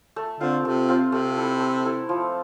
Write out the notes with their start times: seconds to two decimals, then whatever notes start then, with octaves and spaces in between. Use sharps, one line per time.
0.16 A3
0.40 D3 C4 F4
0.64 C3 A3
0.89 C4 F4
1.12 C3 A3
1.37 E4 A4
1.60 A3
1.85 E4 A4
2.09 F3